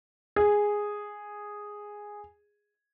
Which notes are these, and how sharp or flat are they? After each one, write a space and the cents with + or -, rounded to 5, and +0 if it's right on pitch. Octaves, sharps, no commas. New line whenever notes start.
G#4 -5